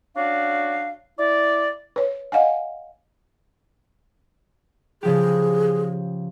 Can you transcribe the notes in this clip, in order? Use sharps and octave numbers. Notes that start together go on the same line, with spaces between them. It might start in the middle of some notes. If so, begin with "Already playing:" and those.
C#4 D4 F#4 D5 F5
E4 D5
B4 C#5
D#5 F5 F#5 G#5
C#3 F3 G4 G#4